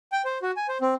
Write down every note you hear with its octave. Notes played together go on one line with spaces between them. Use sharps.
G5
C5
F#4
G#5
C5
C4